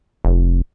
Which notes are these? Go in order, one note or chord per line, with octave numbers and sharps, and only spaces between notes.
F1